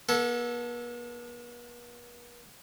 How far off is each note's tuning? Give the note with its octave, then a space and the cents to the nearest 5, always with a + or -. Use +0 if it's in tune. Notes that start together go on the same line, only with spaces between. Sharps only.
B3 -45 A4 +0